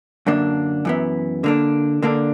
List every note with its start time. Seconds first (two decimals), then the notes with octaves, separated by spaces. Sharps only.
0.27 F#2 D3 A#3 D4
0.85 F#2 E3 B3
1.44 D3 A#3 D4
2.02 D3 A#3 D4